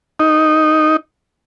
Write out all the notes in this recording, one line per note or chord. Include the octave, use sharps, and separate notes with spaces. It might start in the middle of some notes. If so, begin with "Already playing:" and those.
D#4